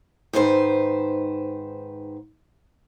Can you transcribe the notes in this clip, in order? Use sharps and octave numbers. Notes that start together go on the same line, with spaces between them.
G#2 D#3 B4 C5